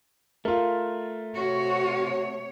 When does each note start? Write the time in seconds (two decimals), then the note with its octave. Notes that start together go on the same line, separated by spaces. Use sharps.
0.45 A3 F4 A#4
1.35 C3 F#4 C#5